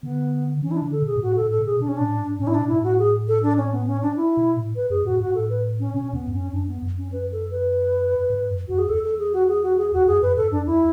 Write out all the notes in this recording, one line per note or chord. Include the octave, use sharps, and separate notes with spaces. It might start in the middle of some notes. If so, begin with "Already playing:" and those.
D3 B3
E3 C#4
E4
D4
D3
A4
B2 G#4
G#2
A2 F#4
A2 A4
A4
B2
G#4
B2 D4
C#4
A2 D4
G#2
A2 C#4
E4
D4
B2
G#2 E4
A2
F#4
G#4
A4
D4
C#4
B3
C#4
D4
E4
B2
A2
B4
F#2 G#4
A2 F#4
G#2 F#4
A2 A4
B4
C#4
B2 C#4
E2 B3
G#2
F#2 C#4
F#2 D4
B3
F#2
C#4
B4
A4
B4
G#2
F#2
F#2 F#4
G#4
E2 A4
A4
G#4
F#4
G#4
F#4
G#4
E2 F#4
F#2 G#4
F#2 B4
G#2 A4
F#2 D4
E2 E4